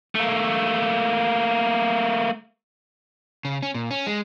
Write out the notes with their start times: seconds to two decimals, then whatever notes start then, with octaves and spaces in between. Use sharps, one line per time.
0.15 A3 A#3
3.45 C#3
3.63 C#4
3.74 A#2
3.91 C#4
4.07 G#3